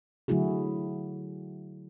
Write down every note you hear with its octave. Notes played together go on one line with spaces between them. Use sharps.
D3 F#3 A3 E4 F#4 G#4